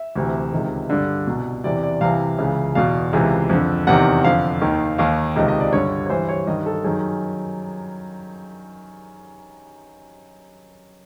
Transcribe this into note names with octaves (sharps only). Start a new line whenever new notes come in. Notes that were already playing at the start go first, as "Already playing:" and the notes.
Already playing: E5
D2 C3 E3
C#2 C3 D#3
G2 D3 D5
C2 B2
E2 C3 E3 D5
D5
C2 C3 E3 F5
C#2 C#3 E3
E2 B2 F5
C#2 C3 E3
F2 D3
E2 C3 D#3 F#5
F2 D3 F5
D#2 D#3
D#2 D#3 F5
C#2 C3 D#3 D#5
D#5
D5
G2 D3 C#5
C#5
G2 E3 C5
C#5
G2 D#3 D#5
A4
F#2 D#3 G#4